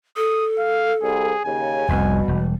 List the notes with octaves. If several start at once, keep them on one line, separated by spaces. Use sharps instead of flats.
A4 D#6
F5
C2 G#4
D#2 C#3 G#5
F1 C2 F2 B2 G3
E1